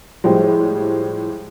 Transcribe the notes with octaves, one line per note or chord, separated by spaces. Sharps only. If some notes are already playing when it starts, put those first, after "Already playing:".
A2 F3 G3 G#3